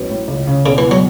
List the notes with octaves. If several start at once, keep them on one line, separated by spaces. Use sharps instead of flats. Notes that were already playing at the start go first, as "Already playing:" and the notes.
Already playing: A1 B2 F#3
A2
C#2
C#3
E1 C#3
E3
E2
F#3